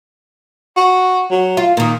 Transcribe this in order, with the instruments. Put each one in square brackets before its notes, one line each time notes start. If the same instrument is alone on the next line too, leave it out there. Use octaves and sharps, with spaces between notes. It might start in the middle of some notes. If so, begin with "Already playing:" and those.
[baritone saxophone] F#4
F#3
[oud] F4
[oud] A#2 D#3 [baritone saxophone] A#3